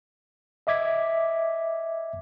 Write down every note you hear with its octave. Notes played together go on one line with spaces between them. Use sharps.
D#5 E5 D6 G#6 B6